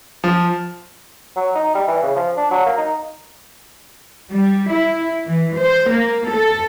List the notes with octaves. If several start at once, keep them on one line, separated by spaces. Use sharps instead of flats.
F3
F#3
D#4
G3
E3
C#3
F3
D4
F#3
A#3
D#4
G3
E4
E3
C5
A#3
A4